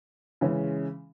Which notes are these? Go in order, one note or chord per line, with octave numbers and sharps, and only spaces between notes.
C#3 E3 G#3 C#4